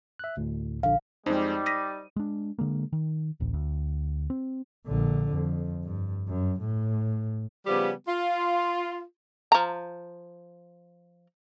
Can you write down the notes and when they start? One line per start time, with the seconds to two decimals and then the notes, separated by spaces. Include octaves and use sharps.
0.19 E5 F#6
0.37 D2 A2
0.83 A#1 D3 F5
1.26 F2 G3 G#3 D#4 C5
1.66 D#6 A#6 B6 D#7
2.16 G#3 D4
2.59 D3 G#3 A#3
2.93 D#3
3.40 D1 A1
3.54 D2
4.30 C4
4.86 A#1 D3
5.31 F2
5.84 G2
6.28 F#2
6.60 A2
7.66 C#3 F3 G3 B3 G4
8.07 F4
9.52 F3 A#5